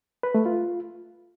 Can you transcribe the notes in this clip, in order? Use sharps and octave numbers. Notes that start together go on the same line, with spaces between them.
B4
A3
F4